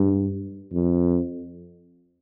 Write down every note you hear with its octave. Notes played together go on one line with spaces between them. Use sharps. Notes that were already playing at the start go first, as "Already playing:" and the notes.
Already playing: G2
F2